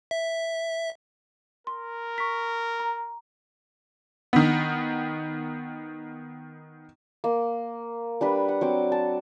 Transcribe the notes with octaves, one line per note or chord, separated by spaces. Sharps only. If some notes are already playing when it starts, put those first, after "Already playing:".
E5
A#4 C6
C#6 B6
A#5
D#3 B3
A#3
G3 D4 B4
F#5
F#3 C4 D6
A5